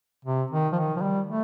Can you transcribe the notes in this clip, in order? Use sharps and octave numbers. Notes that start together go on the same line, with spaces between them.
C3
D#3
F3
D#3
F3
G3
A3